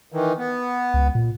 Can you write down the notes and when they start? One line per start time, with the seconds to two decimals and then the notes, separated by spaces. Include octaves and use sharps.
0.12 D#3 E3
0.38 B3
0.94 C#2
1.15 A#2